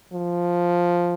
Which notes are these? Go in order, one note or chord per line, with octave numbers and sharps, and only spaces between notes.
F3